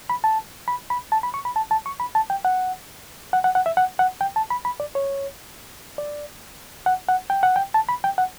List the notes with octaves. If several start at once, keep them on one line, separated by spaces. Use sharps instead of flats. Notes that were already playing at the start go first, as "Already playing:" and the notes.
B5
A5
B5
B5
A5
B5
C#6
B5
A5
A5
C#6
B5
A5
G5
F#5
F#5
F#5
F#5
E5
F#5
F#5
G5
A5
B5
B5
D5
C#5
D5
F#5
F#5
G5
F#5
G5
A5
B5
G5
F#5